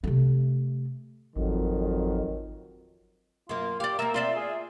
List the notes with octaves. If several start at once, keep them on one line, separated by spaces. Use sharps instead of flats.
C3 A3
G#1 F2 D#3 F#3
F#2 A#3 F4
G4 D5 F5
A#3 A#4 E5
C4 F4 D5 E5
G#4